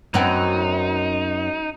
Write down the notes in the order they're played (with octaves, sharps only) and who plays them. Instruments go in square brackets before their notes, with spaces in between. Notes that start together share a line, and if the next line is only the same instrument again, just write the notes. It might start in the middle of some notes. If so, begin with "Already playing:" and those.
[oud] F#2 B3 C4 [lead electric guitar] D#4